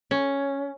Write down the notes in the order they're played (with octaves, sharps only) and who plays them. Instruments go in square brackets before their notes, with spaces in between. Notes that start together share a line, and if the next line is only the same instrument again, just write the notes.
[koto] C#4